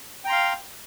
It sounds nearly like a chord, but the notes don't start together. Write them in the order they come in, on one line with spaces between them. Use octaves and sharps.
G5 A#5 C6 F5